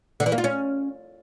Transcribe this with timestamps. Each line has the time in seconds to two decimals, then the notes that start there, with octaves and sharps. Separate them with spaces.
0.20 D3
0.26 E3
0.32 A#3
0.38 F4
0.44 C#4